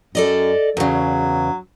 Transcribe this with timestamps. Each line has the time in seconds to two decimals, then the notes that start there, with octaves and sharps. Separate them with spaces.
0.15 F#2 A4 D5 D#5
0.77 E2 C#3 F#3